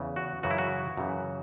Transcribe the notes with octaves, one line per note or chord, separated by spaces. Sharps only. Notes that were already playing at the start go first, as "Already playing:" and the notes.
Already playing: E2 C#3 E3
F#4
F#2 C#3 E3 F#4
E4
F#4
F#2 C#3 E3